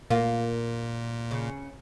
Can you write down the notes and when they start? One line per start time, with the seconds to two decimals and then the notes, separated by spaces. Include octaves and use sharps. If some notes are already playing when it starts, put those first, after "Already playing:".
0.10 A#2 A#3 F4
1.31 C#3